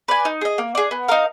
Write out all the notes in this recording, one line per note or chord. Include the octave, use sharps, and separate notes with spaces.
B4 D5 G#5
D#4
G#4 D#5
A#3
D4 G#4
B3
D#4 A#4 F5